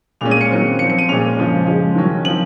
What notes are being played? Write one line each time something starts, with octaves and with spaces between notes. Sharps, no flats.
A#2 G#3 C#4 F7
D#7
C#7
D#3 F#3 C4
F3 C4 C#7
C#7
D#7
A#2 G#3 C#4 F7
C#3 F3 G#3
C#3 F3 G#3
D#3 F#3 C#4
F3 C4 F#7